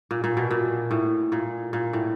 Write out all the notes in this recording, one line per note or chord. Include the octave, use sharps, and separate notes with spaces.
A#2
A#2
B2
A#2
A2
A#2
A#2
A2